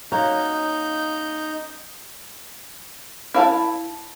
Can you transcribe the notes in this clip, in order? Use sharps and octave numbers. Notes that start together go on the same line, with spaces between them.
A#3 C#4 D#4 F#4 G6
E4 F5 A5